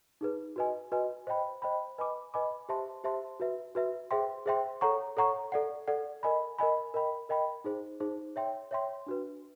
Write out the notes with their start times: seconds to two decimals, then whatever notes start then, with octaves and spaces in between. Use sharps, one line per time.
0.21 D#4 G#4 B4
0.56 F#4 B4 D#5 G#5
0.92 F#4 B4 D#5 G#5
1.27 C5 D#5 G5 B5
1.62 C5 D#5 G5 B5
1.98 B4 D#5 G#5 B5 D6
2.34 B4 D#5 G#5 B5 D6
2.69 G4 C5 E5 A5 C6
3.04 G4 C5 E5 A5 C6
3.40 F#4 B4 E5
3.75 F#4 B4 E5
4.11 G#4 C5 E5 G5 C6
4.46 G#4 C5 E5 G5 C6
4.81 A4 C#5 F#5 A#5 C#6
5.17 A4 C#5 F#5 A#5 C#6
5.52 A4 D5 F#5
5.88 A4 D5 F#5
6.23 A#4 D#5 G#5 B5
6.58 A#4 D#5 G#5 B5
6.94 A#4 D#5 G5 B5
7.29 A#4 D#5 G5 B5
7.64 D#4 G#4 C5
8.00 D#4 G#4 C5
8.36 C#5 E5 G5 C6
8.71 C#5 E5 G5 C6
9.06 D4 F#4 B4